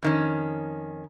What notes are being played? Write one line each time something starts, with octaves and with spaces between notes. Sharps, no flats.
F2 D#3 C#4